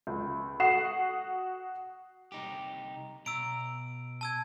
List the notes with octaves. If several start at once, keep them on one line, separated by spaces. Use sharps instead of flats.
C#2
F#4 F#5 D#6 C7 E7
C2 D#4 G4
B2 A#5 E6 D7
A5 E6 G#6